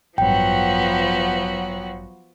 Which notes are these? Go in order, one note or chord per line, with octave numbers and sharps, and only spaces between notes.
A1 G2 F3 F#3 B3 F#4 G5